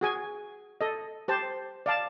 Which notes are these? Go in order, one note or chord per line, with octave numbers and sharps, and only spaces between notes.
F#4 G#4 G#5
A4 D#5
G4 C5 A5
D5 F5 A5